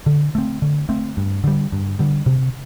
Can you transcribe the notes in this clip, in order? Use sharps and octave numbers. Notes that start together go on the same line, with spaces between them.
D3
A3 C4
D3
A3 C4
G2
D3 G3
G2
D3 G3
C3